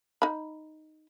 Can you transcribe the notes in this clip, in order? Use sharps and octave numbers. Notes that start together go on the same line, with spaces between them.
D#4 B5